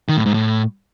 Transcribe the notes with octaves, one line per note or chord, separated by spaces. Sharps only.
D#3
A2
G#2
A2